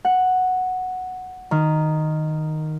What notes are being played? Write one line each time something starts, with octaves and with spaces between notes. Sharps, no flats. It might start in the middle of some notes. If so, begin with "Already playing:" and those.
F#5
D#3